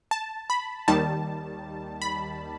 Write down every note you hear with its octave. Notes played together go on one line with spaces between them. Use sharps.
A5
B5
D#2 D#3 G3 A5
B5